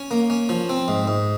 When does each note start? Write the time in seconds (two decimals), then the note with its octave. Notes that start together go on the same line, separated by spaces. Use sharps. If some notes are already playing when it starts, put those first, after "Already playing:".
Already playing: C#4
0.11 A#3
0.30 C#4
0.49 F3
0.69 C4
0.88 G#2
1.07 G#2